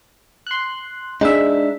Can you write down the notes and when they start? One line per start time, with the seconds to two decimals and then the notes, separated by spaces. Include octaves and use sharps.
0.47 C6 F#6
1.21 G#3 D4 D#4 E5